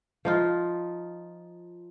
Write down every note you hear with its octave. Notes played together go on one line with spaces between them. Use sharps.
F3 D#4 F4